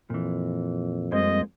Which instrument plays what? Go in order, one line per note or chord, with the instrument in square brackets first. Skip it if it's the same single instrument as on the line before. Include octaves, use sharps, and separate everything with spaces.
[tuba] F2 [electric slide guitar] A#2 E3
[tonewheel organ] F#2 G3 C4 [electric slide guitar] G#3 A#3 C5 [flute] D#5